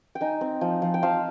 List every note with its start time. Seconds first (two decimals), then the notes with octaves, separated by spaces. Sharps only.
0.15 G5
0.21 D#4 G#5
0.41 C4
0.61 F3
0.82 F3
0.94 G5
1.02 F3 F5